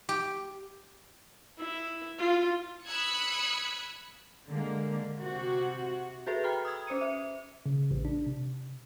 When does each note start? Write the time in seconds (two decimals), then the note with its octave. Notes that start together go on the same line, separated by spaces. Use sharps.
0.09 G4
1.58 E4
2.19 F4
2.85 B5 D#6 E6 F#6 G#6 C#7
4.47 D3 G#3 A#3
5.20 C3 F#4
6.27 F#4 G#4 A4 B4 E5
6.44 G5 A#5 B5 F6
6.65 D#6 E6 G#6
6.87 C#4 C5 D#6 C#7 D#7
7.01 E5
7.66 C#3
7.91 A1
8.05 D4
8.27 C3